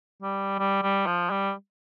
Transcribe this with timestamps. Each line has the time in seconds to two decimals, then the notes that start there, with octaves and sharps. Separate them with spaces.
0.22 G3
0.59 G3
0.82 G3
1.06 F3
1.30 G3